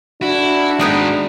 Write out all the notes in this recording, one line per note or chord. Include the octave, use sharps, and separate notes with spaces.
D4 E4 F#4
G#3 B3 D#4 G#4 G5